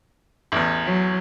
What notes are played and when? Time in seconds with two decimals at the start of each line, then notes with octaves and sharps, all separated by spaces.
0.52 A1 E2
0.85 F#3